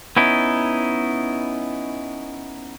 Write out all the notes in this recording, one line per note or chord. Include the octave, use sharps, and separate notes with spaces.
B3 C#4 D#4 E4